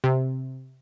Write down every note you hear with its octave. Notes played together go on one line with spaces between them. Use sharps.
C3